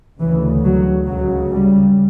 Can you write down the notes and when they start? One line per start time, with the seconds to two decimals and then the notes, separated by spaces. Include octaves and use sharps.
0.19 D2 C#3 E3
0.63 F#3
1.06 C#2 C#3 F#3
1.51 G3